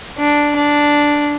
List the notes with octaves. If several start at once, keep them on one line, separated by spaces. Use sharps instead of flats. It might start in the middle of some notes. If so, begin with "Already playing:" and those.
D4
D4